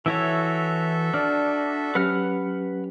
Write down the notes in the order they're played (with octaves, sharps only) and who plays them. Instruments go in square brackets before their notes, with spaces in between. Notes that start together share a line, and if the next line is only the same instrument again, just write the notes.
[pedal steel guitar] E3 E4 C#5 [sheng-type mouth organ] F#4 A4 E5 [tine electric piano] E6
[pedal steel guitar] D4 [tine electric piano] D5 F6
[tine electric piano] F#3 C#4 G4 [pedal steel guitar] B4 F#5 F6